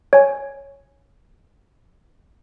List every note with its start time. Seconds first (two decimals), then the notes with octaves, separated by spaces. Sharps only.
0.13 C#5 G#5